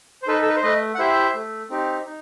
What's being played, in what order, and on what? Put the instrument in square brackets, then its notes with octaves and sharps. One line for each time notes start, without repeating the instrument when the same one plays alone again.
[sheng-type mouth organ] C5
D#4 A4 B4
A4
B4
C5
A3 B4 D#5
F#5
E4 G4 C5 E5
A3
C4 D#4 G4
D#4